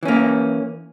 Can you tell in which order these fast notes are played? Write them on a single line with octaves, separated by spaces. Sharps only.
E3 C#4 A#3